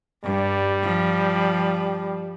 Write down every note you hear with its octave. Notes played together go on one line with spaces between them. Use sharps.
G2 G3
F3